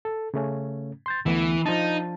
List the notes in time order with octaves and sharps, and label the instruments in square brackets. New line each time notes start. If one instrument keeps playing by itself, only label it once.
[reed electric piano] A4
C#3 A3 C#4
C6 G6 A6
[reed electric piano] D2 A3 B3 [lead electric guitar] E3
[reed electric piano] F3 D4 A5 [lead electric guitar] D#4